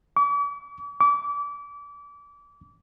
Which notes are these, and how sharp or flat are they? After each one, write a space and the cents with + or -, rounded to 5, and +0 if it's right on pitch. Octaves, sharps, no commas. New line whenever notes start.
D6 -45
D6 -30